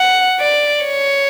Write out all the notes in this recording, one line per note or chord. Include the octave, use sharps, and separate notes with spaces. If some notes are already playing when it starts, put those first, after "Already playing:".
Already playing: F#5
D5
C#5